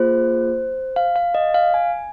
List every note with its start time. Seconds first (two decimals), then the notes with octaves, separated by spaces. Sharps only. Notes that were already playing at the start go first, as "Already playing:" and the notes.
Already playing: A#3 F4 G#4 C5
0.96 F5
1.16 F5
1.35 D#5
1.54 F5
1.74 G#5